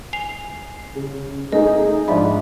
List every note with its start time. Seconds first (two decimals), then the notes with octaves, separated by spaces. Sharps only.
0.13 G#5 C7 F7
0.95 C#3
1.52 A3 D#4 G#4 D#5
2.08 G#2 F3 D4 D5 E5 B5